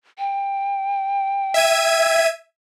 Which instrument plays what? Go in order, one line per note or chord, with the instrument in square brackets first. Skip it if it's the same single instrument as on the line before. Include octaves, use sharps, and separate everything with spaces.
[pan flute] G5
[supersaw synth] E5 G#6 D#7